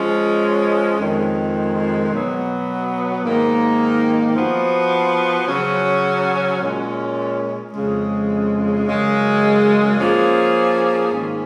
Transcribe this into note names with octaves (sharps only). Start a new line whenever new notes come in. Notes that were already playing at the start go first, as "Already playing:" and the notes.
Already playing: F3 G#3 C#4
F2 D#3 G#3
B2 F#3 B3
G#2 D#3 A#3 D#4
F3 B3 F#4
C#3 F#3 C#4 F#4
A#2 G#3 C#4
F2 C#3 G#3
F#2 C#3 G#3
F3 A#3 C#4 G#4
G#2 D#3 A#3 C#4